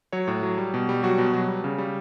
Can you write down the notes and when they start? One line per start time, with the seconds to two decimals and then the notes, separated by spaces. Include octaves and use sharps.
0.13 F#3 C#5
0.28 A2
0.43 F#3
0.58 G3
0.74 B2
0.89 G3
1.03 F#3 F#4
1.18 B2
1.33 F#3
1.48 G3
1.64 C#3
1.78 G3